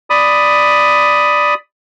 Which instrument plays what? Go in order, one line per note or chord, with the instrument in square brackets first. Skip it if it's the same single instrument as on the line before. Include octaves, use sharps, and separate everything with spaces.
[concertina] D5 B5 D#6